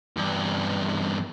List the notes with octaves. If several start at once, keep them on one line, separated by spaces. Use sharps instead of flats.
E2 G2